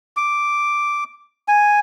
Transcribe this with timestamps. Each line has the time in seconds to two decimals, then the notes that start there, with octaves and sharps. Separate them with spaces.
0.17 D6
1.48 G#5